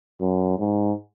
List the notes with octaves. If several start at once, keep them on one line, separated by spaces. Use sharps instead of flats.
F#2
G#2